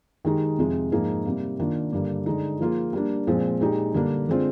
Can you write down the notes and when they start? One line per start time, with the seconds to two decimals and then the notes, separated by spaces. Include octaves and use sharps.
0.25 D#3 G#3 D#4 G4
0.58 F2 C3 F3 G#3
0.92 G#2 F3 A#3 D#4 G#4
1.25 C3 G3 A#3
1.59 D#3 A#3 D4 F4
1.92 G2 D3 G3 A#3
2.26 D3 G#3 D#4
2.59 F3 A#3 F4 G#4
2.93 G3 A#3 D4
3.27 A#2 F3 G#3 C4
3.60 A#2 G#3 D#4 G4
3.94 D3 G3 A#3 D4
4.29 D3 G#3 C4 F4